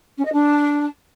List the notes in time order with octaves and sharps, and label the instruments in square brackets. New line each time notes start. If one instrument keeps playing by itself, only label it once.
[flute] C#4
D#5
D4